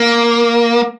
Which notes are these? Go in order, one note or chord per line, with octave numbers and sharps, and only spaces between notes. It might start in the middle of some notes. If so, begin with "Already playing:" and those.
Already playing: A#3